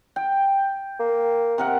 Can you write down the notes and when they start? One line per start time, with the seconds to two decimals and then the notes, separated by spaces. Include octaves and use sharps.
0.16 G5
0.99 A#3
1.58 C3 A#4 F#5